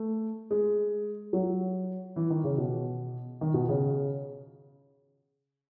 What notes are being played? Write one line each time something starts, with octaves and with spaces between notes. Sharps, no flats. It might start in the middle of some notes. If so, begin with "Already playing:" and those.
Already playing: A3
G#3
F#3
E3
D#3
C#3
B2
D#3
B2
C#3